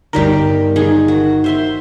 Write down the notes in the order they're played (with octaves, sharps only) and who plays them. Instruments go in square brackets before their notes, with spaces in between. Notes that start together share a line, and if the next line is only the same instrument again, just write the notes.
[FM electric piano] G1 A#4 [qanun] D#3 G3 G4
[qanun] D#3 G#4
F#4
C5 E5 C6